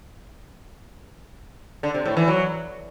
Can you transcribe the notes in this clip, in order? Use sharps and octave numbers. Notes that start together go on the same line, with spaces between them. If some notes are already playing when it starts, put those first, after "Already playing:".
D3
C3
A2
E3
F#3